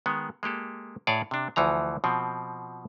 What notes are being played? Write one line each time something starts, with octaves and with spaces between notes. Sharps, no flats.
D#3 G#3 B3
G#3 A#3 G4 A4
A2 G#4 C#5 D5
C3 D4
D2 E3 F3 A#5
B2 F3 C4